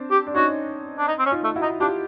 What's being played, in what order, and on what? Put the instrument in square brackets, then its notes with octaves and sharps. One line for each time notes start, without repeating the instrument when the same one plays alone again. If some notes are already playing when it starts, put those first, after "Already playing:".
Already playing: [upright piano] C4 D4
[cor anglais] G4
[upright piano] D4
[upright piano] C#4 D#4 [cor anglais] F#4
[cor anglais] D4
D#4
C4
C#4
[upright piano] D#4 F4
[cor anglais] A3
[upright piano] E4 F#4
[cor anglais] D#4
[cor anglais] D4 [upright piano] F4 G4